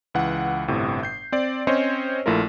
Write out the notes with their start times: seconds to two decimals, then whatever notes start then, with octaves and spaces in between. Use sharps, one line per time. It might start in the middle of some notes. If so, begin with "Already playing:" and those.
0.14 C#2 E3 F#5
0.68 G1 A2 C3
1.03 G6 C7
1.32 C4 D5
1.67 C4 C#4 C5 C#5 D#5
2.26 A#1 A3 E4 F4 A#4